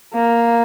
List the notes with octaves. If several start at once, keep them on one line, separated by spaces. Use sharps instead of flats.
A#3